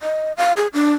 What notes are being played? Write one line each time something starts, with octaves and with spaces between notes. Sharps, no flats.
D#5
F5
G#4
D4